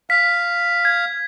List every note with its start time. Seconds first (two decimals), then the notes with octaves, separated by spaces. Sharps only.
0.10 F5 B6
0.85 G#6